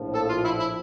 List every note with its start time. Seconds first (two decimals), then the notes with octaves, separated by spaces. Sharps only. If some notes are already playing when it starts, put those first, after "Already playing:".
Already playing: A#1 A2 F3
0.15 A4
0.29 F4
0.45 E4
0.60 E4